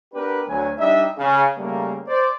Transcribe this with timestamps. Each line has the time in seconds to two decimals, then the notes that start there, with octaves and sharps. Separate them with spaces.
0.14 B3 D4 G4 A#4 B4
0.48 D2 F#3 G#5
0.79 G3 D4 D#4 D#5 E5
1.18 C#3
1.58 C#3 G3 A3 A#3
2.08 C5 D5